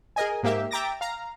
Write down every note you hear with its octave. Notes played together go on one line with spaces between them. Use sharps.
G#4 A#4 D#5 G#5
G#2 A#3 G4 E5
E5 G5 A#5 D6 A6 A#6
F5 A#5